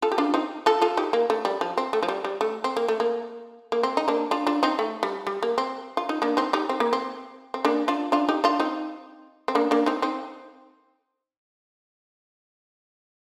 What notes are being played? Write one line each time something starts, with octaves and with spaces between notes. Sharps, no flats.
F4 A4
G4
D4 F4
C4 D#4
F4 A4
F4 A4
D#4 G4
A#3
A3
G3
F3
C4
A3
F3
G3
G3
A3
C4
A#3
A3
A#3
A#3
C4
D#4
A#3 D4
D4 F4
D4 F4
C4 D#4
A3
G3
G3
A#3
C4
F4
D#4
A#3 D4
C4 D#4
D#4 G4
C4
A#3
C4
C4
A#3 D4
D4 F4
D4 F4
D#4 G4
D4 F4
C4 D#4
C4
A#3 D4
A#3 D4
C4 D#4
C4 D#4